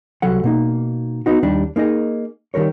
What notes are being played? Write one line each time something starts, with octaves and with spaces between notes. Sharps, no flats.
C2 F#3 A4 F#5
B2 A#3 D#4
B3 D#4 F#4
D#2 G3 D4 D#4 G4
A#3 D#4 G#4 D#5
D#3 G3 A#4 C#5